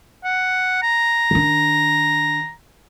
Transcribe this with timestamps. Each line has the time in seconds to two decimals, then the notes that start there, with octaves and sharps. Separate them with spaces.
0.24 F#5
0.82 A#5
1.31 D#3 D4